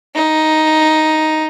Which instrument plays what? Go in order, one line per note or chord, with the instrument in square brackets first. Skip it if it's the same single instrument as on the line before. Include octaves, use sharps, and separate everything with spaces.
[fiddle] D#4